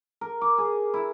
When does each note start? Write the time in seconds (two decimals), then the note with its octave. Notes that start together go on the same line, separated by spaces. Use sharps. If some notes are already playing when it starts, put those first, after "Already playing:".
0.21 A#4
0.41 D6
0.58 G#4
0.94 E4